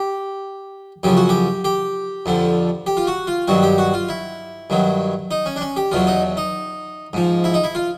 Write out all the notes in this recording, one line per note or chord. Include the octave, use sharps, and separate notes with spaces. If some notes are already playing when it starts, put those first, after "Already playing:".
Already playing: G4
F#2 C#3 F3 G4
F#4
G4
G4
F2 D3 F3
G4
F4
F#4
F4
G2 D#3 F#3 F#4
G4
F#4
F4
E4
G2 D#3 F#3
D#4
C#4
D4
C#4
G4
E2 B2 F#3 F4
D#4
D#4
G#2 F3
E4
D#4
E4
F4